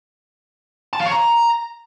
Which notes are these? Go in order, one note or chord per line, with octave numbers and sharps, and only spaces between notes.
A5
F5
C#5
A#5